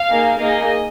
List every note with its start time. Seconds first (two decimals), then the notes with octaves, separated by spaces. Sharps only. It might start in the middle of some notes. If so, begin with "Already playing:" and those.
Already playing: F5
0.10 A#3 D#4 G#4
0.40 A#3 D#4 G#4 D#5